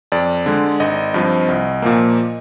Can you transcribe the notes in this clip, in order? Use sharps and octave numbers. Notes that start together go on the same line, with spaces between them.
F2 D5
D3 G#3
G#1 D#5
G2 F3 C4
C2
A#2 F3 A#3